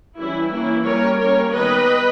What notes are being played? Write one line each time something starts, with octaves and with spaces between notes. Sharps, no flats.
E3 G3 C#4 E4
E3 A#3 C#4 E4
G3 A#3 C#4 A#4 C#5
G3 A#3 C#4 A#4 C#5
D#3 G3 B3 B4 D#5